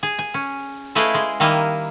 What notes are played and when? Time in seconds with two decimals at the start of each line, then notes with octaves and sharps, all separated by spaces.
0.03 G#4
0.19 G#5
0.34 C#4
0.95 A3 E4 G#4 B4 D#5 F5
1.14 G#3
1.40 D#3 G3 A#3 E4 D#5 F5